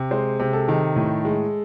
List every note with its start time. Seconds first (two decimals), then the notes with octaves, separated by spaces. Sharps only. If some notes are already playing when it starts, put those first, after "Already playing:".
Already playing: C3
0.11 G#3 C5
0.40 C3
0.53 A4
0.68 D#3
0.96 A2
1.25 G#3